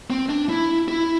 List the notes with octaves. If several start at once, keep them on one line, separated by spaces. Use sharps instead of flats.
C4
D4
E4
E4